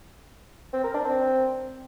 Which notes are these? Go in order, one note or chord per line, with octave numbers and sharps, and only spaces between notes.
C4
A#4
D4
C4